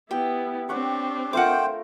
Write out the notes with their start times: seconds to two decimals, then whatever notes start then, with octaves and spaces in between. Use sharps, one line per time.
0.11 B3 E4 G4 G5
0.69 C4 D4 G4 C#5 F#5 C#6
1.33 A3 F4 A#4 C5 F#5 G5 D6